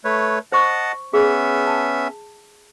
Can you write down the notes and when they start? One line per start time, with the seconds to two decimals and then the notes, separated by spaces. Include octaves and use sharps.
0.04 A3 B4 C#5
0.52 C5 D#5 F#5 A5 C#6
1.13 B3 C#4 G#4 E5
1.67 A5